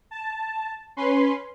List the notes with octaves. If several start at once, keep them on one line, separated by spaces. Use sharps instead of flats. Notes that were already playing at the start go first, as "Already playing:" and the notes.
A5
C#4 B4 C6